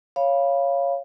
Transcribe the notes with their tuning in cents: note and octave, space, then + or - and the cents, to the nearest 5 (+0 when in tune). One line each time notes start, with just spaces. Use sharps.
C#5 +0 F5 -10 B5 -15